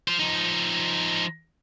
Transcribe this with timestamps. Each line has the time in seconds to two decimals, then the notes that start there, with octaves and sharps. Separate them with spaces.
0.08 F4 C5
0.19 F3 D#4